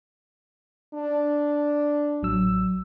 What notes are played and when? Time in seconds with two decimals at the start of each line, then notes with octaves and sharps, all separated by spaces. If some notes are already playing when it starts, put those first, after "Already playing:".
0.94 D4
2.22 A1 F#3 E6